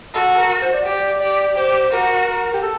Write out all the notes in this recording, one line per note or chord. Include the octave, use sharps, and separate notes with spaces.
F#4 A4
A4
A#4
C5
D5
G4 D5
G4 D5
G4 C5
F#4 A#4
A#4
G4
A4